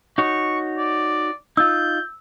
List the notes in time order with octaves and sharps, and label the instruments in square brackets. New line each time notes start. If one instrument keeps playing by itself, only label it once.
[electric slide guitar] D#4 F#4 C#5 [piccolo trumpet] C#6
[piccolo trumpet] D5
[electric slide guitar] D#4 F4 [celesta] E6 [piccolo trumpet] G6